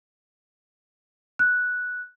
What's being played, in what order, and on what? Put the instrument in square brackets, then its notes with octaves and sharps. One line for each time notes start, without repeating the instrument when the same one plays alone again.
[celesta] F#6